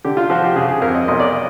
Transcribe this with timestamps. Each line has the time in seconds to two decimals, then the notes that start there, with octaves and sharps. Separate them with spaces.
0.04 D3 G4
0.17 F4
0.30 F3 F#4
0.44 G4
0.56 C#3 G#4
0.69 G#4
0.81 F2 A#4
0.94 D#5
1.08 B1 D#5
1.20 D5
1.32 D#5